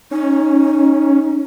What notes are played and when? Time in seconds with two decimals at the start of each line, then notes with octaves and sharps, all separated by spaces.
0.11 C#4 D#4